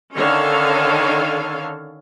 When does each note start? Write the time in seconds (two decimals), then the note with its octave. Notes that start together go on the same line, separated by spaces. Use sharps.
0.16 D3 D#3 C#4 A4 C#5 F5